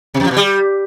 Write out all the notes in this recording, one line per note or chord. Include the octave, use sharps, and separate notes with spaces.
C3
F2
F3
B2
G3